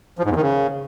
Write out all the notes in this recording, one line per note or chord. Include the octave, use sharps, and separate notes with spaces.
F3
G#2
E2
D#3
C#3